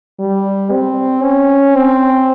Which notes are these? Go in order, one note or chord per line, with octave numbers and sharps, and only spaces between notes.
G3
C4
C#4
C4